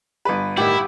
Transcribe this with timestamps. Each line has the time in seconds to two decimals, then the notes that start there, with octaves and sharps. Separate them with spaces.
0.25 G1 B4
0.57 A2 D#3 G3 E4 G4 F#5